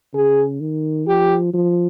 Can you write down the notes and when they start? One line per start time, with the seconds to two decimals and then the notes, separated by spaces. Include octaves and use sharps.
0.13 C#3 G#4
0.61 D#3
1.07 F3 G4
1.54 F3